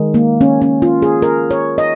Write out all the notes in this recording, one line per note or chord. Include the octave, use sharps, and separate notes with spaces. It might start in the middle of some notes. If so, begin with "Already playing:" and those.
Already playing: D#3 G#3
A#3
C#4
C#4
F4
G#4
A#4
C#5
D#5